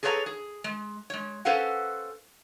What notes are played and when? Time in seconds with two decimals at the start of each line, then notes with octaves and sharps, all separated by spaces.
0.03 G#4 A4 B4 C#5 E5 A#5
0.26 G#4
0.64 G#3
1.10 G#3 C#5
1.45 C#4 A4 B4 C5 F5 F#5